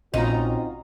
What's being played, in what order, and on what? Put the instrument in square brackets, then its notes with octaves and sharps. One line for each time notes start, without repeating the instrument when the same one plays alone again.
[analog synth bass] A#1 [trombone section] C4 C#4 F#4 [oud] D#4 [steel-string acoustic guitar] F4 A#5